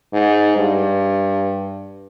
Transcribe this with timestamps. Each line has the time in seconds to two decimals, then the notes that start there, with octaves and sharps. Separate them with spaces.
0.13 G#2
0.57 G2